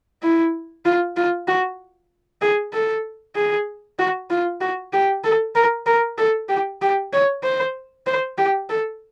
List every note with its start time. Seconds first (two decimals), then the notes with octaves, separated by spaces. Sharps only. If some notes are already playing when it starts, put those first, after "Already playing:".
0.23 E4
0.85 F4
1.16 F4
1.48 F#4
2.41 G#4
2.73 A4
3.36 G#4
3.99 F#4
4.30 F4
4.61 F#4
4.93 G4
5.24 A4
5.55 A#4
5.86 A#4
6.18 A4
6.49 G4
6.82 G4
7.13 C#5
7.43 C5
8.07 C5
8.38 G4
8.69 A4